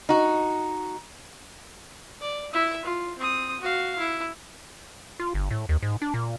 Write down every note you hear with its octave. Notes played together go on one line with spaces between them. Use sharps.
D#4 F#4
D5
E4 E5
F4
C4 D#6
F#4 F5
E4
F4
G1
A2
D#2
G#2
D4
A#2